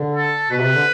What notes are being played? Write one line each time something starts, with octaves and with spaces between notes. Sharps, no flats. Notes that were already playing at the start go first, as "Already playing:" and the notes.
Already playing: D3
A4
B2 B4
C3
D3